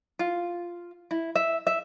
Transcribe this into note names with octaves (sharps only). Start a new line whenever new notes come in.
F4
E4
E5
E5